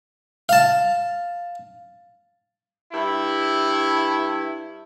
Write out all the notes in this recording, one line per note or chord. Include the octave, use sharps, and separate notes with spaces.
F5 A5
G2 E4